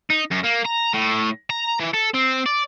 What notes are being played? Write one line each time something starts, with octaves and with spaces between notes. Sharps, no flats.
D#4
F#2
A#3
A#5
A2
A#5
E3
A4
C4
D5